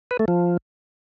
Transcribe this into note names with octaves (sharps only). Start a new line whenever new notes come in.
B4
A3
F3